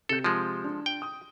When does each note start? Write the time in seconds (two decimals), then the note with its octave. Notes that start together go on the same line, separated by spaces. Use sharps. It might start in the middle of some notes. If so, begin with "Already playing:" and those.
0.09 C3 A4 G6
0.24 F3 G#3
0.64 D4
0.86 G5
1.02 D#6